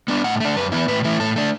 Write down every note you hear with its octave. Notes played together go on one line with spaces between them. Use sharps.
B3 D4
A2 F#5
A3 D4
F#2 B4
E3 B3 E4
A2 B4
E3 A3 E4
A2 A4
A3 D4